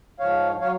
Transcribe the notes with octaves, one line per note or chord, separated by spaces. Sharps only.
G#2 F3 C#5 F5
F#3 C#5 F5